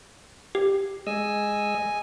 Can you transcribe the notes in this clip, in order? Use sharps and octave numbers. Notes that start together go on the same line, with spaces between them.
G4
G#3 D#5 G#5 E6